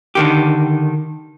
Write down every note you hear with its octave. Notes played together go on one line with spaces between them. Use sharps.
D3 D#3 G4